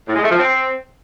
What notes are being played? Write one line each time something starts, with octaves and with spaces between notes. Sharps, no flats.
A2
G#3
A3
F3
C4